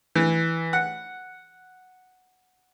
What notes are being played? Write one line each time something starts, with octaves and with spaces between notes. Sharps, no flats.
E3
F#5